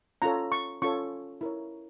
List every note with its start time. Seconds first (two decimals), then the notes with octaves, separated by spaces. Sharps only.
0.22 C#4 F4 A4 C#5 A#5
0.52 C#6
0.82 C#4 F4 A4 C#5 C#6
1.41 E4 A#4 C#5